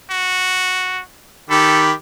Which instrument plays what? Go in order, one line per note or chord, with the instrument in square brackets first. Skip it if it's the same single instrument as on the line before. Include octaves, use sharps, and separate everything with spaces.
[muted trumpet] F#4
[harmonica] D#3 G4 B5 [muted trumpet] A4